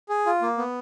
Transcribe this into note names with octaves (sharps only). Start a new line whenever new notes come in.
G#4
F4
A#3
B3